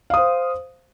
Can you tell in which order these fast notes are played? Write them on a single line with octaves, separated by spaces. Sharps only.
F5 D#6 C5